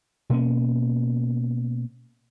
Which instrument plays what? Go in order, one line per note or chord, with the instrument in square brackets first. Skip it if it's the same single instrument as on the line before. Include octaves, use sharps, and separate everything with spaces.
[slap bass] B2 A#3 C#4